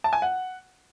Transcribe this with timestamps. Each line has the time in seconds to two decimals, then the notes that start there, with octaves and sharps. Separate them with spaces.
0.04 A5
0.13 G#5
0.22 F#5